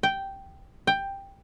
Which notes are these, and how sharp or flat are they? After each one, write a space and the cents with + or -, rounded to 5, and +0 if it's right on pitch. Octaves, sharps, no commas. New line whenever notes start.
G5 -5
G5 +10